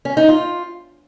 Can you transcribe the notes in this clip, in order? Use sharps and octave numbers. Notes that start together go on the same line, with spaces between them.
C#4
D#4
F4